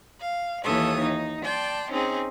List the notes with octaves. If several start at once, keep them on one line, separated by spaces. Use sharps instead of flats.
F5
D#2 E3 A4 C#5 D#6
D#4
D5 G5 A5 C6
C4 C#4 D#4 G#4